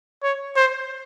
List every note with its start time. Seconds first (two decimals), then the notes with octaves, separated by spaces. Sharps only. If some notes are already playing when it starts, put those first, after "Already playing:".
0.23 C#5
0.56 C5